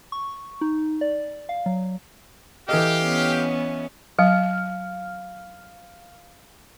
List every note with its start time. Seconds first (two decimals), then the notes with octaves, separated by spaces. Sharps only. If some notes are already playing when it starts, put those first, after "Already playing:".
0.12 C#6
0.61 D#4
1.01 D5
1.49 F5
1.66 F#3
2.69 E3 G4 A4 D#5 F5
3.04 B3 C#4
4.19 F#3 F5 F6